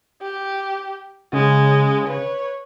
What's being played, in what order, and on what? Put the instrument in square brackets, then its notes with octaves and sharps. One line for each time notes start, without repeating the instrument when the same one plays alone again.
[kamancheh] G4
[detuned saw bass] C#3 [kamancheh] G#3
[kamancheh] B4 C#5